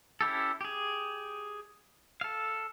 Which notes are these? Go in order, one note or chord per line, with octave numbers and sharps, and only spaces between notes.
C#4 E4 G4 A4
G4 G#4
A4 F5